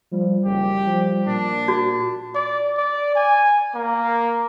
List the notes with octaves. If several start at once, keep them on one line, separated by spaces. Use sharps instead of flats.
F3 G3
F#1 G4
F3
A#2 D4
F#4
D5
D5
G#5
A#3